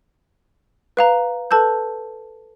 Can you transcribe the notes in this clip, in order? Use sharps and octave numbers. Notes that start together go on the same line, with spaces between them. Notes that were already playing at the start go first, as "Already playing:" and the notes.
B4 F5 A#5
A4 B4 A5 E6 G6